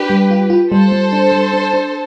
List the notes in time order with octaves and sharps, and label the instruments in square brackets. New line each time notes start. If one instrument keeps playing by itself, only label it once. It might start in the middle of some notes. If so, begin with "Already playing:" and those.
Already playing: [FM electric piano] D4 [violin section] G4 B4
[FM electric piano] G3
F4
F4
[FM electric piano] G3 [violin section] A4 C5
[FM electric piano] G3
D4
G3
D4
D4